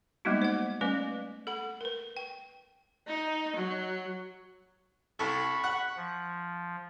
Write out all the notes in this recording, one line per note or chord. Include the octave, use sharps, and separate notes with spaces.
G3 G#3 A#3 B3 D#4 F#4
C5 F#5
G3 A3 C#4 B4 D5
A4 F#5 B5
A#4 B4
G5
D#4
F#3
C2 A4 B5 C#6
F#5
F3